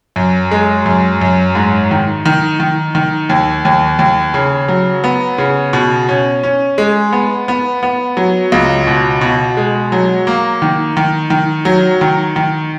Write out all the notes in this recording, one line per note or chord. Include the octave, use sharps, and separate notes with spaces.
F#2
G#3
F#2
F#2
G#2
D#3
D#3
D#3
D#3
D#2
D#2
D#2
C#3
F#3
B3
C#3
B2
C#4
C#4
G#3
B3
B3
B3
F#3
C#2
B2
B2
G#3
F#3
A#3
D#3
D#3
D#3
F#3
D#3
D#3